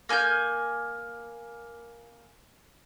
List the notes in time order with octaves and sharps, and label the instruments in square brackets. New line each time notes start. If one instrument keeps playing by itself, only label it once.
[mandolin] A#3 G#5 F6 G6